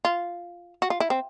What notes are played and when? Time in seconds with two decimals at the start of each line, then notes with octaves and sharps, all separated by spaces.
0.05 F4
0.82 F#4
0.90 F4
1.00 E4
1.10 C4